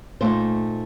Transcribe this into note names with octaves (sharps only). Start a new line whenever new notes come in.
A#2 A3 D#4 C5